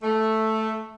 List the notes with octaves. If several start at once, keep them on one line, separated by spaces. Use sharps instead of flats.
A3